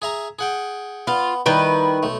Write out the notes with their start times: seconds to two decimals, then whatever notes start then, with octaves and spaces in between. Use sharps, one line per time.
0.02 G#4 E5 A#5
0.39 G#4 F#5 G5
1.07 B3 F4
1.46 D#3 G3 E4 B4
2.03 B1 A3